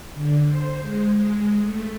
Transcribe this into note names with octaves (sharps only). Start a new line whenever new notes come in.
D3
C5
G#3
G#3
A3